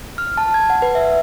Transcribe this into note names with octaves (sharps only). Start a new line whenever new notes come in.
F6
A5
G#6
F#5
B4
E5